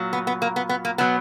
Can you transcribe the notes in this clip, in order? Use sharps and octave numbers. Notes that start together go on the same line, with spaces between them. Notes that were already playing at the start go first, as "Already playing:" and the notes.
Already playing: A#2 F#3
B3
B3
A#3
B3
B3
A#3
B2 F#3 B3